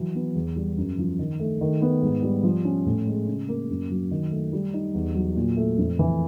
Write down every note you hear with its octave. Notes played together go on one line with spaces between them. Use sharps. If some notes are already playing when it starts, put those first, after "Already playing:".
Already playing: E3 F#3
B3
E2
G3
F#2
F3
D#3
A3
D#3
B3
G#2
G3
F3
C#4
A2
G#3
C#3
A#3
F#2
F#3
D#3
A3
G3
D#4
E2
F#3
A#2
A3
F2
E3